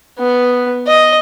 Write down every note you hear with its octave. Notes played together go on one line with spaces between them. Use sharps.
B3
D#5